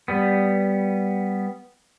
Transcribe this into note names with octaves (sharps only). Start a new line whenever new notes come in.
G3 B3